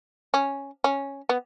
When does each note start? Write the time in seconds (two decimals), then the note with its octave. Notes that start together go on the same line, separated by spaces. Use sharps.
0.34 C#4
0.84 C#4
1.29 B3